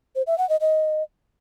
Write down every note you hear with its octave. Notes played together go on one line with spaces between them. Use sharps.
C5
E5
F#5
D#5
D#5